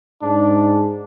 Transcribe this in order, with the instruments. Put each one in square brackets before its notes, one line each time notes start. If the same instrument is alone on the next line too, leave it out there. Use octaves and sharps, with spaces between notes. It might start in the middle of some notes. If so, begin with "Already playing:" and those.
[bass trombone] G#2 [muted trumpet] D4